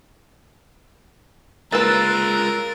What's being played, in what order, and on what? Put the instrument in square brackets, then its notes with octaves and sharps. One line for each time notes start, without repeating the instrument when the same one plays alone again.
[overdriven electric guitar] G#3 F4 [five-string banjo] A#3 B4 [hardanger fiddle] A#4 [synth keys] E6 F#6 A6